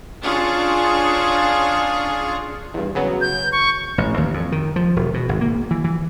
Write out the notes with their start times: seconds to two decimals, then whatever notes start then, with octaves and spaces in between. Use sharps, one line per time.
0.22 C#4 D4 F4 G#4 C#6
2.74 E2 G2
2.95 C#3 F#3 B3
3.21 G6
3.52 C#6
3.98 A1
4.17 D#2
4.34 F2
4.52 D#3
4.76 F3
4.96 E1
5.14 B2
5.29 G#1
5.41 A#3
5.71 E3
5.84 E3